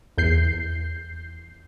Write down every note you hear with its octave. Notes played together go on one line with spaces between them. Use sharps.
E2 G6 C7